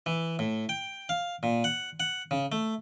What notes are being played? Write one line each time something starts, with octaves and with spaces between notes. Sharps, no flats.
E3
A2
G5
F5
A#2
F#5
F#5
C#3
A3